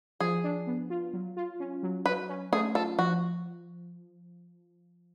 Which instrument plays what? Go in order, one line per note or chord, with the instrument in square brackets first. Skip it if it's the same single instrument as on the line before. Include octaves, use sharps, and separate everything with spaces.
[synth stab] F3 [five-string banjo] G#4
[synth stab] D4
B3
F4
F#3
F4
C#4
F#3
[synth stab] F#3 [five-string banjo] B4
[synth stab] C#4
[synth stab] A3 [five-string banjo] G#4
[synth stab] F4 [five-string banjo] A4
[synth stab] F3 [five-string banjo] F#4